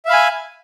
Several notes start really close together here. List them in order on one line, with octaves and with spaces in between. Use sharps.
E5 F5 B5 G#5